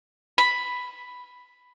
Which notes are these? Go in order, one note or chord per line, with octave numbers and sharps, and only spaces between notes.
B5